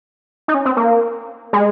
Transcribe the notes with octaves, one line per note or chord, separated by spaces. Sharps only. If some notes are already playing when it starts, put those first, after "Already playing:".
D#4
C#4
C4
A#3
G#3